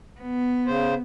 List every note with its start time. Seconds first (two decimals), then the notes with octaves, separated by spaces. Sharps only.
0.21 B3
0.67 C#3 C5